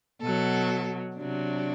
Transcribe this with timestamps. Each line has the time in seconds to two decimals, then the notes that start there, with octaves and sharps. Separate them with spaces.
0.21 B2 F#3 A4
1.17 C3 F#3 D4